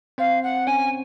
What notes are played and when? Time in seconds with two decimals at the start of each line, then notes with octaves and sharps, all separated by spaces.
0.18 C4 C5 F5
0.43 F#5
0.67 C#4 C#5 G#5